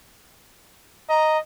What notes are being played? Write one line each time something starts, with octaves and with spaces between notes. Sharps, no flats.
D#5 A#5